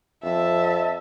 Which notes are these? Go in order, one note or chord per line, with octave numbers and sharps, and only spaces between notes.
F2 E5 A5